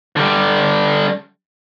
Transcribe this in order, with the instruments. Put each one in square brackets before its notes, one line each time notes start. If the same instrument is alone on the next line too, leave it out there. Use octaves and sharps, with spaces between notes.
[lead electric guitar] D3 G3